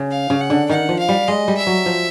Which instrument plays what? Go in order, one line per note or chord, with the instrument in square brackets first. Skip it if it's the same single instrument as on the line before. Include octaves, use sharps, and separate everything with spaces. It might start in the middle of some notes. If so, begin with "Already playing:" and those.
Already playing: [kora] C#3
[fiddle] F5
[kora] C#3
[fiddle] F#5
[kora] D3
[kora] D#3 [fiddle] F#5
[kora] F3
[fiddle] F5
[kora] G3
[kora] G#3 [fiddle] D#5
[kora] G3
[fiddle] E5
[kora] F#3
F3